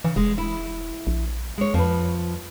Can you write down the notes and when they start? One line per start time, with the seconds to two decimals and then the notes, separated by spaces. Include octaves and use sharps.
0.04 C#3 E3
0.16 E1 G#3
0.38 E4
1.07 A#1
1.58 G#3 C#5
1.74 F2 F3 B4